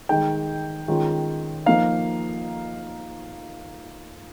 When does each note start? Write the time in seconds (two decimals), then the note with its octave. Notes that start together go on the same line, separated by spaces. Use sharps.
0.09 D#3 G#3 D#4 G5
0.88 D#3 G#3 C#4 F4
1.66 F3 A#3 D#4 F5